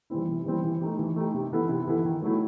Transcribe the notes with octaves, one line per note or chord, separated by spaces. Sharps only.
E3 G3 C4 E4
C3
E3 G3 C4 E4
E3
A3 D#4 G4
E3
A3 D#4 G4
C3
E3 B3 E4 A4
C3
E3 B3 E4 A4
D#3
F#3 A3 E4